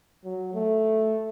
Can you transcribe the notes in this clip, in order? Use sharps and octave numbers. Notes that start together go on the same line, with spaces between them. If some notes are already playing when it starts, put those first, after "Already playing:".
F#3
A3